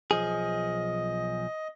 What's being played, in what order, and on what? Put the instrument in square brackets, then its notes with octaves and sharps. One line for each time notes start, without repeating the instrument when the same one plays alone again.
[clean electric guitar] B1 F3 G#4 [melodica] D#5